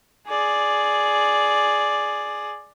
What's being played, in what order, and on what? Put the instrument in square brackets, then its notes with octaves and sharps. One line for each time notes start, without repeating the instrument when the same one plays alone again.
[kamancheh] G#4 D5